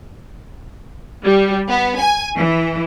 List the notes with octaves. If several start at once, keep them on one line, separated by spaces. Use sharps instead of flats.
G3
B3
G#5
E3